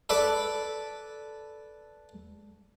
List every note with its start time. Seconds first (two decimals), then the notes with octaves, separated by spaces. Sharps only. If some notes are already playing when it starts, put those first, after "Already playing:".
0.09 A4 B4 D5